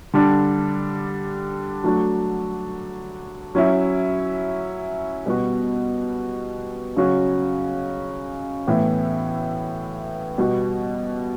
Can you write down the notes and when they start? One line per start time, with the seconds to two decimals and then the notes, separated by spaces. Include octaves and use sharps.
0.13 D3 G3 D4
1.84 F#3 A3 D4 F#4
3.55 F#3 C#4 E4
5.26 B2 G3 B3 F#4
6.97 C#3 F#3 C#4 F#4
8.67 A2 E3 B3 E4
10.38 B2 G3 B3 F#4